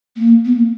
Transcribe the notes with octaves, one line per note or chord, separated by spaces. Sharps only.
A#3
B3
A#3